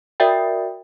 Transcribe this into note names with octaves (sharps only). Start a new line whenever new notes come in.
F#4 A#4 D5 E5 G5